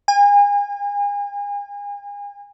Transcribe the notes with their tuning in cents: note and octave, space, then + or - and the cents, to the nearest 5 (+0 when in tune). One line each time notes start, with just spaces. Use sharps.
G#5 -35